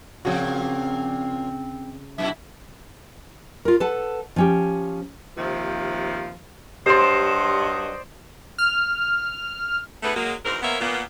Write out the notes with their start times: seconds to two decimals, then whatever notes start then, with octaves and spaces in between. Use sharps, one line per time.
0.25 A#2 C#3 F3 C4 F#4
2.18 F#2 B2 E4 E5
3.65 F4 A#4
3.80 A4 B4 F#5 A5
4.36 F3 C#4 G4
5.37 D#2 C3 F3
6.86 G2 F#3 G4 C5 D5 D#5 C6
8.58 F6
10.03 D3 A3 B3 E4 G#4 B4
10.16 F#3 G#3 A#3
10.45 E2 G#2 B2 C4 A#4
10.63 A#3 B3 A#4 C5 C#5 E5
10.81 A#2 A#3 B3